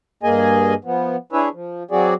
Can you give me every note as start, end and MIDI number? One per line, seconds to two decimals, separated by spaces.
0.23 0.74 43
0.23 0.74 58
0.23 0.74 68
0.23 0.74 75
0.23 0.74 80
0.85 1.16 53
0.85 1.16 59
1.33 1.49 62
1.33 1.49 64
1.33 1.49 68
1.33 1.49 71
1.33 1.49 73
1.33 1.49 76
1.53 1.83 53
1.91 2.14 54
1.91 2.14 60
1.91 2.14 66
1.91 2.14 68
1.91 2.14 74